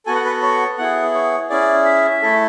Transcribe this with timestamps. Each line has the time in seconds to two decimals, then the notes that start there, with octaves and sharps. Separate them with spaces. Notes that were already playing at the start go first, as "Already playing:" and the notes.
0.06 B3 F#4 A4 G#5
0.15 F#5
0.25 B4
0.42 C#5
0.78 B3 E4 G#4 F#5
1.14 C#5
1.50 C#4 E4 G#4 D5
1.85 E5
2.22 A3 E4 A4